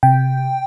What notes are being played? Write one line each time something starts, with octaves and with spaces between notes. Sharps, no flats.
C3 G5